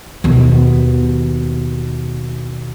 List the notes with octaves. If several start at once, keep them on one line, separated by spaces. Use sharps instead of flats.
D#2 B2